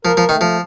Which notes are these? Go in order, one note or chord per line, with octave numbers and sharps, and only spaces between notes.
F3 A#4
F3
D#3 A3
F3